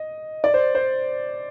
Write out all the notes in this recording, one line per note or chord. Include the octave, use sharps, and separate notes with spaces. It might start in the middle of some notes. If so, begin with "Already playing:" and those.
Already playing: D#5
D5
C5
C5